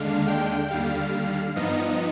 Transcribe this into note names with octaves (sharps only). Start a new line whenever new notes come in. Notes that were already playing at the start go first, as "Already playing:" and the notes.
Already playing: D#2 D3 G#3 D4 F5
G5
D#2 D3 G3 F5
G2 F3 B3 D#4 D#5